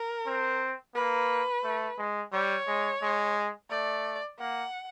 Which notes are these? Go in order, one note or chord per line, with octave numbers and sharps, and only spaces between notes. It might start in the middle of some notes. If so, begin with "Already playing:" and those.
Already playing: A#4
C4
A#3 B4
A3
G#3
G3 C#5
G#3
G#3
A3 D5
A#3 F#5